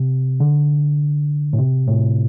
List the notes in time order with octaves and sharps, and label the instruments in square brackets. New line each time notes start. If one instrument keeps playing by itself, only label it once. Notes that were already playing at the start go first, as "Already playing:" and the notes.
Already playing: [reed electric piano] C3
D3
A2
C3
A2